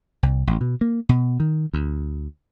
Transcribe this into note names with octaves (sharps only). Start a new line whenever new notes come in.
C2
A1
B2
A#3
B2
D#3
D2